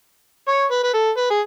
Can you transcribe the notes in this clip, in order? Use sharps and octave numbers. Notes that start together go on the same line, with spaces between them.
C#5
B4
B4
A4
B4
G#4